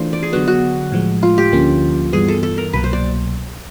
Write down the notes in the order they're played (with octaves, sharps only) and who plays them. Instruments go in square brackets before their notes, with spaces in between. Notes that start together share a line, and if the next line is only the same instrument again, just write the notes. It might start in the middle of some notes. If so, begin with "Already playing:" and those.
Already playing: [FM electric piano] E3 A3 D4 F4 [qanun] C5
[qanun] D5
G#4
[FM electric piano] D3 F#3 B3 [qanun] F#4
[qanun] F#4
[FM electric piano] A2 F3 G#3
[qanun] F4
G4
[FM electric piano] D2 D3 F3 A#3 C#4
[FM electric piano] G2 E3 G3 B3 [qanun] G#4
[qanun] A4
A4
A#4
[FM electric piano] C2 B2 F#3 A#3 [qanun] B4
[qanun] C5
D5